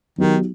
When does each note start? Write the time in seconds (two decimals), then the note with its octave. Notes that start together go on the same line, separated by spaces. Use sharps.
0.18 D#3 F#3 B3 D#4 G4